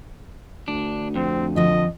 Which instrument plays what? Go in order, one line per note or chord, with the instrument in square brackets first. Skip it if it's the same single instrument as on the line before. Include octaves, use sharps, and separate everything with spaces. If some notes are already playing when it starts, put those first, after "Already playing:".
[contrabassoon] D2 [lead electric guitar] D4
[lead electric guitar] F2 [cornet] C4
[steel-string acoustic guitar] D3 F3 [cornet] D#5